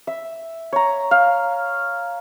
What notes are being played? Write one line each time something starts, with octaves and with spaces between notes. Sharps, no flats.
E5
C#5 A#5
F5